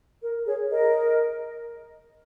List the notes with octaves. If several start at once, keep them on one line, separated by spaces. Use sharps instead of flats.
A#4
G#4 C#5
A#4 D#5